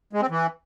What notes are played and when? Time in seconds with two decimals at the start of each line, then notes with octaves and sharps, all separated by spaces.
0.13 G#3
0.21 C4
0.30 E3